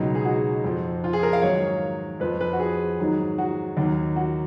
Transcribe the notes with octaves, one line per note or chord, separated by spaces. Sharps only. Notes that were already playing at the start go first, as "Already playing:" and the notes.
Already playing: C#2 B2 F#3 D#4
G#4
F#4
F2 F3
F4
G#4
A#4
F5
G#2 D#3 F#3 C#5
F2 F3 B4
B4
F#4
G#4
G#2 D#3 F#3
F#4
D#2 D#3 F#3
F#4